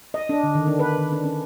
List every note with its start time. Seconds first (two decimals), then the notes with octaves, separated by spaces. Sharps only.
0.14 D#5
0.29 D4
0.43 D3
0.55 D#3
0.68 D4
0.79 B4
0.98 D#3
1.12 D4
1.24 C#4